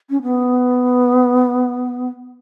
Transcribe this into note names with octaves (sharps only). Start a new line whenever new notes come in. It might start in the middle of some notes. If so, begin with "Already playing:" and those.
C#4
B3